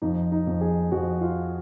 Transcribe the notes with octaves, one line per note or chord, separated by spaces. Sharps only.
F2 D#4
D#4
F2
G#4
F2 F#4
F4